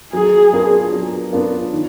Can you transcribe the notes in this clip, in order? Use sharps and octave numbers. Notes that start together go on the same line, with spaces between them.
F#3 G#4
B3 D4 F4 A#4
F#3
B3 D4 F4 A#4
D#3